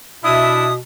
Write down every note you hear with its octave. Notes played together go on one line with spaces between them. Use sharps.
B2 D4 E4 E5 D#6